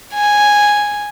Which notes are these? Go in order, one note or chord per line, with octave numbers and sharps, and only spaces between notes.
G#5